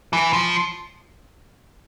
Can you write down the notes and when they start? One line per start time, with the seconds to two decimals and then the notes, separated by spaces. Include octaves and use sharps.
0.13 E3
0.33 F3